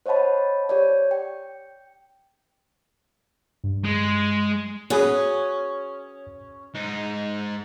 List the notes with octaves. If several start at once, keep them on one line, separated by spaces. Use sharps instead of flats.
C5 C#5 D#5 F#5 A5 B5
G4 C#5 D5
G5
G2
G#3
C#4 F#4 G#4 B4 C#5 D#6
G#2 D#4